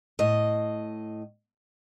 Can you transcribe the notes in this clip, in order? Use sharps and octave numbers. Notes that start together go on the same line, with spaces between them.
A2 D#5